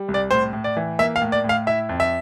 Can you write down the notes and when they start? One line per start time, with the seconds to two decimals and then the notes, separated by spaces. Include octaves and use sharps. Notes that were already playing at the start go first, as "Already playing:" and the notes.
Already playing: G3
0.08 C2
0.14 D5
0.31 A2 C5
0.53 A2
0.64 D5
0.77 E3
0.99 A#3 E5
1.16 F5
1.21 A2
1.32 D5
1.44 A2
1.49 F5
1.67 E4 E5
1.89 F2
2.00 E5